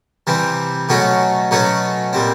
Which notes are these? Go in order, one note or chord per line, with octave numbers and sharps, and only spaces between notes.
C3 E3 G3 C4
B2 F#3 A3 C#4 F#4
B2 F#3 A3 C#4 F#4
A#2 G3 C4